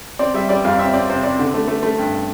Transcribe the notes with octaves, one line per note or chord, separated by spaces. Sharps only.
C4 D5
G3 E5
G3 D5
F2 F5
C4 E5
C4 D5
C3 C5
C3 D5
D3
A3
A3
A3
G2